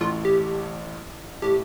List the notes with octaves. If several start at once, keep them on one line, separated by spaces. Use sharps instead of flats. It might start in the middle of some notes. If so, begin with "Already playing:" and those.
A1 A2 F4
G4
A2 G4